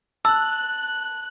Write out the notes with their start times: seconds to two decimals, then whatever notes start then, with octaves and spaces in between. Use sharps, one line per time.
0.25 A5 E6 F#6